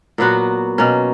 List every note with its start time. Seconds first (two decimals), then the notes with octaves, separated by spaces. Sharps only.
0.18 A#2 F#3 B3 F#4
0.78 B2 A#3 C#4